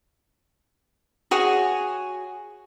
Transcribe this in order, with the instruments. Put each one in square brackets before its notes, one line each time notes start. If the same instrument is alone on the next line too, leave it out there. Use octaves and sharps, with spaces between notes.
[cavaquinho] F#4 G#4 C#5